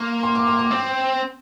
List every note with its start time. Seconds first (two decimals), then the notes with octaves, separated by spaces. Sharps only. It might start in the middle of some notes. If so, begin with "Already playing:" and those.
Already playing: A#3 C6
0.23 C6
0.35 D6
0.47 C6
0.59 D6
0.71 C4